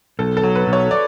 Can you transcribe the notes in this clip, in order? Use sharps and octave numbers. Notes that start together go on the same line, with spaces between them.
B1 A4
A4
F#3
B4
B1
C#5
D5